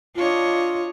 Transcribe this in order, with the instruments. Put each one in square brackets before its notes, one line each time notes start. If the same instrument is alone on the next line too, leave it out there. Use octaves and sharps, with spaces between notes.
[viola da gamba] D4 C#5 D#5 [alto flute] F4